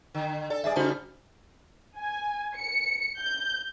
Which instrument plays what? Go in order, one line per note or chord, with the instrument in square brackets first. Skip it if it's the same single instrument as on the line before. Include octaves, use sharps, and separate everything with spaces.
[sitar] D3
[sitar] A4 [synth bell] D5
[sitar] G2 G#4 D5 [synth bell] E5
[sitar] C#3 G3 D#4 [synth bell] F#4 C5 A5
[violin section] G#5
C#7
G6